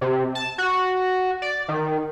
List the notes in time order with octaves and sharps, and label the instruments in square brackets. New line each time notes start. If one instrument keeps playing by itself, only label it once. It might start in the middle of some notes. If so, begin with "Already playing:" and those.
[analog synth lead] C3
A5
F#4
D5
D#3